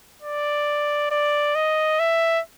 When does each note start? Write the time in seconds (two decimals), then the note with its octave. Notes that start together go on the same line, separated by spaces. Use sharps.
0.22 D5
1.11 D5
1.55 D#5
2.00 E5